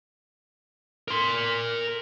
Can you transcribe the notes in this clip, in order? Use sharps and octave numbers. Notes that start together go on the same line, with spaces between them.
A#4 C6